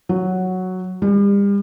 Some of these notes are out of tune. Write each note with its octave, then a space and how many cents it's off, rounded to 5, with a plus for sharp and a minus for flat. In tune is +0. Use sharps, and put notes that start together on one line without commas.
F#3 +0
G3 +40